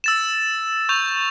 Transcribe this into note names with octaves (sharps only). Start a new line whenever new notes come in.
E6 A6 E7
C#6 G6 F7